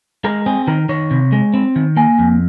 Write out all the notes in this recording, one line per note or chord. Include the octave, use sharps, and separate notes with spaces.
G#3 A#4
C4 G#4
D#3 A#4
D#3 C#5
C3
G#3
C4
D#3
A#3 G#5
F2